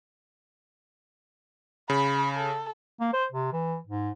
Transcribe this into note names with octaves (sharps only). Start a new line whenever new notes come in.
C#3 B5
A4
A#3
C5
C3
E3
G#2